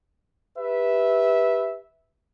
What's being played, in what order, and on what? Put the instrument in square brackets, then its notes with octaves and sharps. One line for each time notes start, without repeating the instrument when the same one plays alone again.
[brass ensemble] G4 B4 E5